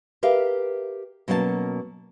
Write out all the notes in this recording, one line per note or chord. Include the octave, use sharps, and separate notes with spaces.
G4 A#4 B4 E5 F5
B2 F#3 A#3 C#4 D5 A5